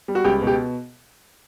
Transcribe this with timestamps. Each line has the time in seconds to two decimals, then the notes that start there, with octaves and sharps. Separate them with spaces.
0.08 G3
0.15 F#4
0.24 C#2 G4
0.42 B2
0.47 G4